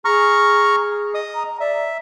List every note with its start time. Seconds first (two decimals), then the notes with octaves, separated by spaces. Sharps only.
0.05 G#4 A#5 C#6 F6
1.14 D#5 D#6
1.35 A#5
1.60 D5 E5